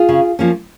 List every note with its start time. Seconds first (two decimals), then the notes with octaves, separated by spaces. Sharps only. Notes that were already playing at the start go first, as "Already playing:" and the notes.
Already playing: F4 G#4
0.09 C#3
0.39 F3 A#3 C#4